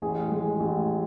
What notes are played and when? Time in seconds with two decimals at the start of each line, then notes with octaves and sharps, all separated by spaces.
0.02 A1 G#4
0.31 G#3
0.60 A1